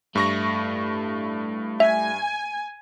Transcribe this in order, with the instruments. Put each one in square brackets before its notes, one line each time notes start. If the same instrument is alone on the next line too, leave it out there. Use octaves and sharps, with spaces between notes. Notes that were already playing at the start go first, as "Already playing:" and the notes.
[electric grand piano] G2 C#6 A#6 [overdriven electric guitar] A3 E4
[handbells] E5 [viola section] G#5